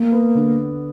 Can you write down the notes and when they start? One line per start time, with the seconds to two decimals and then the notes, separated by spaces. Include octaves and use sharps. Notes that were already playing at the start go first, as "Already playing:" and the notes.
Already playing: A#3
0.12 B3
0.35 D3